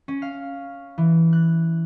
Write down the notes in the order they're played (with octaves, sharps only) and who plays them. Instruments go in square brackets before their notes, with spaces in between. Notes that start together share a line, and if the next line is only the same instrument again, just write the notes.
[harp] C#4
F5
E3
F#6